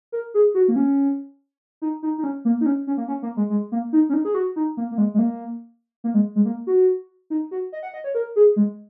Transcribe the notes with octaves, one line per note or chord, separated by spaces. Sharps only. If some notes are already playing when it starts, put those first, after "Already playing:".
A#4
G#4
F#4
A#3
C#4
D#4
D#4
D#4
C#4
A#3
D#4
C#4
C#4
A#3
C#4
A#3
G#3
G#3
A#3
D#4
C#4
D#4
G#4
F#4
D#4
A#3
A#3
G#3
G#3
A#3
A#3
G#3
G#3
A#3
F#4
D#4
F#4
D#5
F#5
D#5
C#5
A#4
G#4
G#3